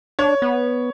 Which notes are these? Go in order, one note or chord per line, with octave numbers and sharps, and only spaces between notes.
D4 C#5
B3